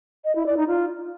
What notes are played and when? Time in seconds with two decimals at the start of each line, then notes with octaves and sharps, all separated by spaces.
0.25 D#5
0.35 E4
0.46 D5
0.57 D#4
0.68 F4